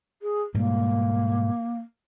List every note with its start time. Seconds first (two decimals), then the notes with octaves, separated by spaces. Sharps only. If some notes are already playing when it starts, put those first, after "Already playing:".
0.22 G#4
0.54 G#2 B2 G3 A#3